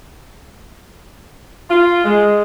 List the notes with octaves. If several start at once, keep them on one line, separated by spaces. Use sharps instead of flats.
F4
G#3